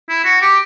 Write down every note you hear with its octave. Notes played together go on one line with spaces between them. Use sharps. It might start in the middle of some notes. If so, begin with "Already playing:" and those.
E4
F#4
G4